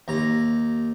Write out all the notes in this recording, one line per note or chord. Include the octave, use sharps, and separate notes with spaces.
D#2 A#5